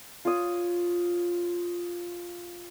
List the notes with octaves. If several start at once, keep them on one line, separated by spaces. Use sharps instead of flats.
F4 C#5 D#6